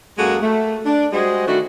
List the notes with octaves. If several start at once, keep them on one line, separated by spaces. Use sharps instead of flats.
F#2 G#3 A#3 F#4 G#4 A4
A3
D4
G3 G#3 F#4 G#4 C5 D#5
D#3 A3 D4 E4 F#4